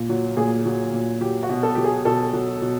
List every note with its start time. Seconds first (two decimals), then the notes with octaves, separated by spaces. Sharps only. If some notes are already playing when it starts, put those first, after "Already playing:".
Already playing: A#2
0.09 F#3
0.37 A#2 G#4
0.66 F#3
0.93 A#2
1.21 F#3 G4
1.43 F#4
1.49 B2
1.63 A4
1.75 F#3 G4
1.84 G#4
2.05 B2 A4
2.33 F#3
2.62 B2